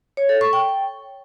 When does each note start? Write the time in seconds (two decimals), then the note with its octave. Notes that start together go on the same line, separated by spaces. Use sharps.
0.17 C#5
0.29 A4
0.41 C#6
0.53 G5